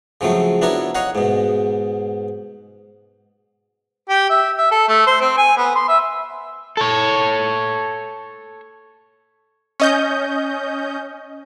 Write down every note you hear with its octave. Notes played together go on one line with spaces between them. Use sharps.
C#3 F3 F#3 A3 C4
B3 D4 E4 F#4 A#4 C#5
C#5 D#5 F5 F#5
G#2 B2
G4
E5
E5
A4
A3
C5
C4
G#5
B3
C6
E5
A4 C#5
C#4 D#5 G6